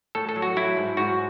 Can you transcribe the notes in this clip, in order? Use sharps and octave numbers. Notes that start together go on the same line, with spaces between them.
A2 A4
A4
F#3
F#4
F#3 E4
G#2
G#2 F#4